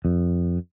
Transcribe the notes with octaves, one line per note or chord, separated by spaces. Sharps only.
F2